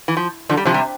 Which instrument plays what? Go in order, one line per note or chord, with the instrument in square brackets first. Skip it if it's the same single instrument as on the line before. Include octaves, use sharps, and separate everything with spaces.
[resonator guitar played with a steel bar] E3
F3
[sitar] D3 [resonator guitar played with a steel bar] F3
[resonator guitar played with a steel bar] G3
[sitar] C3 [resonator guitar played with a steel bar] F3
[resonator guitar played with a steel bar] G3